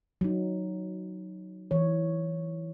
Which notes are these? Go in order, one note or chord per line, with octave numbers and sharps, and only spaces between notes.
F#3 D#4
E3 C#5